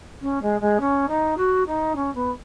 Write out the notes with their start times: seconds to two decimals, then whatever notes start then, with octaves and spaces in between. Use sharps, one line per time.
0.21 C#4
0.41 G#3
0.60 G#3
0.80 C#4
1.08 D#4
1.37 F#4
1.66 D#4
1.95 C#4
2.14 B3